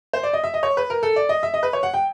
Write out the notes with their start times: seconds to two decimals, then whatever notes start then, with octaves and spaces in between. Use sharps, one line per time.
0.13 C5
0.23 D5
0.33 D#5
0.44 E5
0.54 D#5
0.63 C#5
0.77 B4
0.90 A#4
1.03 A4
1.16 D5
1.29 D#5
1.43 E5
1.54 D#5
1.63 B4
1.73 C#5
1.83 F#5
1.94 G5